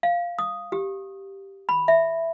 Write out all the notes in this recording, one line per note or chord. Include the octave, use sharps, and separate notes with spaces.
F5
D#6
G4
B5
E5